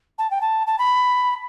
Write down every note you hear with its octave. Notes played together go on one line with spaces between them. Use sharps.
A5
G5
A5
A5
B5